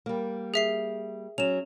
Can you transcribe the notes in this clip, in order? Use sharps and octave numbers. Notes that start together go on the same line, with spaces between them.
G3 A#3
G#4 E5 C7
F#3 C#4 E7 F7